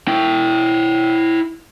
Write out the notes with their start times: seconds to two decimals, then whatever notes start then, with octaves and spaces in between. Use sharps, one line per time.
0.08 E4 G5